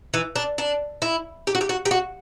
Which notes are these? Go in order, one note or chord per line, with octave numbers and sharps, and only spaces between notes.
E3
D4
D4
E4
G4
F#4
G4
F#4
G4
F#4